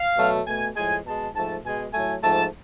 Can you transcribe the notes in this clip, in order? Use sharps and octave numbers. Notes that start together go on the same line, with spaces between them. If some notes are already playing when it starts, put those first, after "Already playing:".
Already playing: F5
B2 F#3 A3
B2 A3 G#5
A2 F3 G#3 G#5
B2 G#3 A5
G#2 F3 A3 A5
B2 G#3 G#5
A2 F#3 A3 G#5
G#2 F3 A3 A5